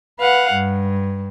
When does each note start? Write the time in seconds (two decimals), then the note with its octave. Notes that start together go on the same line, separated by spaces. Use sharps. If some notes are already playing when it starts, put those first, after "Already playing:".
0.19 B4 F5 F#5
0.51 G2